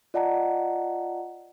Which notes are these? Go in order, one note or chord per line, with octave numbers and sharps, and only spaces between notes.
F4 D5 D#5 F#5 A5 A#5